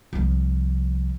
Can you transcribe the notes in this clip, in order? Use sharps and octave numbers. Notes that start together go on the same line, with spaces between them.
C2 F3